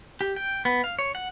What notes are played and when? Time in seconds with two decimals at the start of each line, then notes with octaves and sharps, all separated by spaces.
0.21 G4
0.36 G5
0.65 B3
0.84 F5
0.99 C#5
1.15 F#5